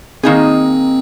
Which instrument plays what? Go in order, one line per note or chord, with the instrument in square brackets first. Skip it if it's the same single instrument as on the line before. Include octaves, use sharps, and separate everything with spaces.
[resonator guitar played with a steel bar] D#3 A#3 D#4 G#4 [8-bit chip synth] C4